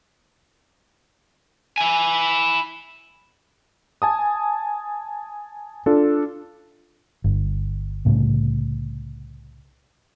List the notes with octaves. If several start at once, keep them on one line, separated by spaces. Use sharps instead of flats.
E4 G#5
G#5 A5 D#6
D4 F4 A4
G1
C2 A2 C#3